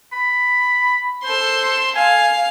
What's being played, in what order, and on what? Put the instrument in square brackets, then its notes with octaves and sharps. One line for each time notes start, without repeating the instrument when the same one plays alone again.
[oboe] B5
[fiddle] A4 C6 [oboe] C5
[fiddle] F5 [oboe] G#5